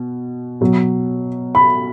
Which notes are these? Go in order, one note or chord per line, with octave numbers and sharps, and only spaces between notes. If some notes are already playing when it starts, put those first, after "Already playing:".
Already playing: B2
B2 F#3
B5